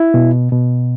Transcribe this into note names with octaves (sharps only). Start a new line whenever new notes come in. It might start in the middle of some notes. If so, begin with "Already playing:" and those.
Already playing: E4
B2
B2